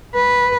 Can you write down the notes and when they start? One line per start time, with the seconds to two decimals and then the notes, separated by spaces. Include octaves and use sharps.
0.14 B4